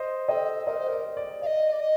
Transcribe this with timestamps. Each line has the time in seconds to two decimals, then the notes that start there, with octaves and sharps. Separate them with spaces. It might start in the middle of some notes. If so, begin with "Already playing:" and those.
Already playing: C5 D#5
0.29 A4 D#5 G5
0.66 A#4 C5 D#5
0.77 C5
0.88 A#4 D5
1.17 D5
1.41 D5 F5
1.46 D#5
1.72 D5
1.80 D#5